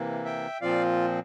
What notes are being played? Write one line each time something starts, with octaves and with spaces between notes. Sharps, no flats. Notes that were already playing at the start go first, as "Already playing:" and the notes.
Already playing: C3 E3 A#3
E5 G5
A#2 F3 C4 F4 D5 F5